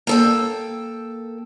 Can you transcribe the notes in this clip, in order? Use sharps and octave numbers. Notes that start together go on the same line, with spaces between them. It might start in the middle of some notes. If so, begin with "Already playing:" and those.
A#3 A4 G5